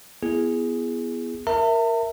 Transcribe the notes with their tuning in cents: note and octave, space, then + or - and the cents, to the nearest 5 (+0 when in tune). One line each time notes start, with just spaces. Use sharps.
B3 +0 E4 +35 G#4 +0
A#4 +0 E5 +0 A5 +45